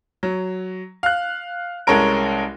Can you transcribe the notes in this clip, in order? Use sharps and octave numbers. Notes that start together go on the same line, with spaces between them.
F#3
F5 F#6
C2 G#3 C#4 A4 A#4 D7